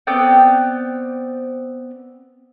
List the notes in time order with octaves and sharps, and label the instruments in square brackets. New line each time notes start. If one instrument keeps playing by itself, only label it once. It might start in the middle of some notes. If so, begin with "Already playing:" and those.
[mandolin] B3 C4 D5 G5